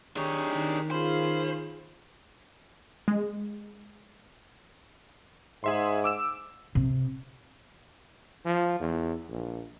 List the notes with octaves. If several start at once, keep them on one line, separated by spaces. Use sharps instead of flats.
D#3 D4 D#4 G4 G#4 C#5
D#3
C#4 F4 G#4 C5 B5
G#3
G#2 G#4 E5 C6
D6 E6 E7
C3
F3
E2
A#1